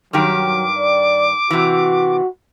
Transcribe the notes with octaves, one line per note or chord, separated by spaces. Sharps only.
G2 D#3 F#3 G4 D6
D5
C3 E3 F#4